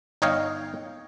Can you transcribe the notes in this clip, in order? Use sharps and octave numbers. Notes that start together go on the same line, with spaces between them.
G1 D#4 C#5 D#5 F5 G5